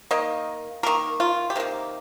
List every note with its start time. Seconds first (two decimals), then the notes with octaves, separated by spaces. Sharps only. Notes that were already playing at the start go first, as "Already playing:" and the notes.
0.11 D#3 A#3 D#5
0.83 D#3 A#3 A#4
1.20 F4
1.50 G4
1.56 C3 D#3 A#3